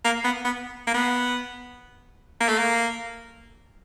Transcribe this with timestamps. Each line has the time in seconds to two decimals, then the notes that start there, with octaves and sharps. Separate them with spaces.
0.05 A#3
0.24 B3
0.45 B3
0.87 A#3
0.94 B3
2.41 A#3
2.48 A3
2.58 A#3